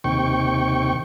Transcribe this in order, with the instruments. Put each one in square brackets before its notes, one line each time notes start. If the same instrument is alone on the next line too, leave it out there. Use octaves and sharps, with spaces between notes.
[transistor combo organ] D#2 C3 G5 C#6